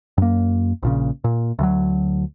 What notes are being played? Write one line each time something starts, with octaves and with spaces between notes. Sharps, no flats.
F#2 A#3
A#1 A#2 C#3
A#2
D2 E3 F#3